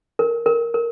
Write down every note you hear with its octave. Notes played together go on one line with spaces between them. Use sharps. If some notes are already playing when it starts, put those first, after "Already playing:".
A#4
A#4
A#4